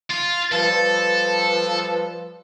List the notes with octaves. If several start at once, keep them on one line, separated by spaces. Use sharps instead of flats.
F4
F3 G3 A4 B4